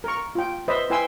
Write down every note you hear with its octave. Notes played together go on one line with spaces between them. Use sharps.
A#4 C#6
F4 G5
B4 C5 D#5 E5
E4 B4 G5 G#5 C6 E6